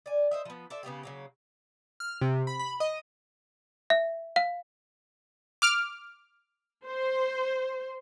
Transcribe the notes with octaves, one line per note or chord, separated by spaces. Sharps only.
D5 G#5
C5 D#5 E5
F3 B3
A4 C5 D5 E5
C#3 B3 F4 G4
C#3 F#3 A#3
F6
C3
B5
B5
D#5
E5
F5
D6 F6
C5